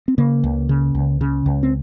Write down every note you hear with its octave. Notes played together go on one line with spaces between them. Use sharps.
C4
C#3 A#3
C#2
C#3
C#2
C#3
C#2
C4